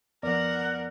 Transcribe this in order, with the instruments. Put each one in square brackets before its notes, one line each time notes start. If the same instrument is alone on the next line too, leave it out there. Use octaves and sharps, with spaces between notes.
[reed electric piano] F2 B3 D5 [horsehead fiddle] A#4 F#5